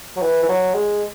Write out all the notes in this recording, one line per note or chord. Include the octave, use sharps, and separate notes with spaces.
F#3
E3
E3
F#3
G#3